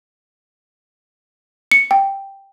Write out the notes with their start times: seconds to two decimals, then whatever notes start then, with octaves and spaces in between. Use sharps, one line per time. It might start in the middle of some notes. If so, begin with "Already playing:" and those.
1.71 C#7
1.91 G5